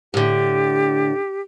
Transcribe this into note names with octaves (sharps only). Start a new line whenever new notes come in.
A2 D3 G4